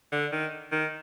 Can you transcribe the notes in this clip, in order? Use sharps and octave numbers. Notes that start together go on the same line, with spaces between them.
D3
D#3
D#3